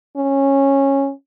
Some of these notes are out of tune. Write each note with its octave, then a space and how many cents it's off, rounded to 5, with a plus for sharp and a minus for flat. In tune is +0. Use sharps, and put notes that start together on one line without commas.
C#4 -15